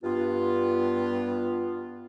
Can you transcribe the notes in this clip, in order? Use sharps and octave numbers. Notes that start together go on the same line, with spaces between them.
G2 B3 F4